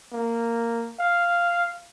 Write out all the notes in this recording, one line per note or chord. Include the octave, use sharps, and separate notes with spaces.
A#3
F5